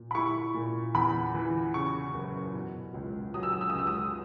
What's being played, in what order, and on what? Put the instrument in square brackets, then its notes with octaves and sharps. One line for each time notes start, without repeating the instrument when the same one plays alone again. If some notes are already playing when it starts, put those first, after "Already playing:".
Already playing: [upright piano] A#2
B5
E4 C#6
A#2
E2 B5
E3
C#3 C#6
F#1
B2
C#2
F#3 D#6
E6
D#6
E6
C#2 D#6
E6
D#6